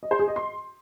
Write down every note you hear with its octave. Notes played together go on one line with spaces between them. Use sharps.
D#5
C5
G#4
D#5
C6